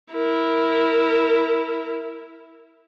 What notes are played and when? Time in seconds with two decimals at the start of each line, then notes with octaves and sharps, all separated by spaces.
0.13 E4 A#4